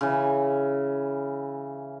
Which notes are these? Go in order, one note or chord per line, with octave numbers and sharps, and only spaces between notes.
C#3 E3